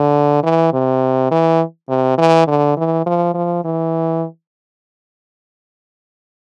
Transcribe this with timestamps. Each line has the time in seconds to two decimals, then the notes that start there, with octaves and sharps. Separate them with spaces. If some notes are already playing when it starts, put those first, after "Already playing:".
Already playing: D3
0.43 E3
0.73 C3
1.31 E3
1.89 C3
2.18 E3
2.47 D3
2.77 E3
3.06 F3
3.34 F3
3.65 E3